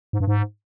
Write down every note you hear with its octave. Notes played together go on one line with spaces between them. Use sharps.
G#2
G2
G#2